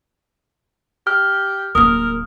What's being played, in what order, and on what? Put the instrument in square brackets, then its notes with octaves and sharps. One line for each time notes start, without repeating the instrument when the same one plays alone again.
[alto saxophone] G4 [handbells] F6
[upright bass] D1 A#3 [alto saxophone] A#4 [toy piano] D#6